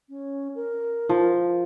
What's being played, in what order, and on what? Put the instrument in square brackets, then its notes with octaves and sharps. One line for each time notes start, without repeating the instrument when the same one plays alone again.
[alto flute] C#4
A#4
[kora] F3